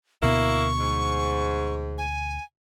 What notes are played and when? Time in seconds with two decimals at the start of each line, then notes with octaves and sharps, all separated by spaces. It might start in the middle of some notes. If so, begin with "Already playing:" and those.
0.23 D2 B2 A#3 B3 E4 C#6
0.79 G#2
1.98 G#5